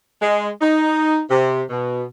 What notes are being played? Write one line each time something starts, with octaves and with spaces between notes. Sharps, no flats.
G#3
D#4
C3
B2